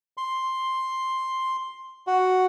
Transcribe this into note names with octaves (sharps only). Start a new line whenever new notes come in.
C6
F#4